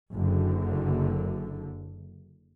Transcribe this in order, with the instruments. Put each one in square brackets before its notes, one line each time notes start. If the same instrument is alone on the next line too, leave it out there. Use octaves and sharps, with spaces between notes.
[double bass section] F#1 F#2 D3